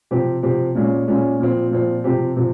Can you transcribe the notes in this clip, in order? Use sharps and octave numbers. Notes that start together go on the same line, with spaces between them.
C3 F3 C4 G4
C3 F3 C4 G4
A#2 G#3 C#4
A#2 G#3 C#4
A#2 F3 C4
A#2 F3 C4
C3 F3 C4 G4
C3 F3 C4